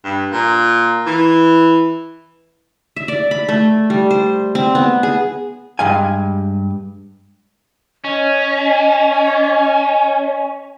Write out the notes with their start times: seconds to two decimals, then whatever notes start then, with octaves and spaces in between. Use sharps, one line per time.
0.04 G2
0.32 A#2
1.06 E3
2.96 E5
3.08 D5
3.31 B5
3.49 A3
3.90 G3
4.11 C5
4.55 C4
4.75 B3
5.03 G#4
5.79 G2 G#3 F5 G#5
8.04 C#4 D#5